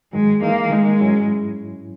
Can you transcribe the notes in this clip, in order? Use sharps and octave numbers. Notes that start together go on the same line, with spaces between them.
G#2 D#3 F#3 G#3
E3 G#3 A#3 D#4
D#3 G#3 A#3 D#4 A#4
G#2 F#3 C#4 E4